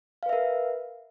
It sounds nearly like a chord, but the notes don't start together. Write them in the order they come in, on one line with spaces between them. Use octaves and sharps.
F5 B4 E5 A#4